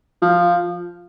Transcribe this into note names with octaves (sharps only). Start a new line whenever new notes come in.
F3